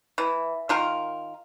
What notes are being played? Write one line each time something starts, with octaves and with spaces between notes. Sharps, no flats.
E3
D#3 F4 A#4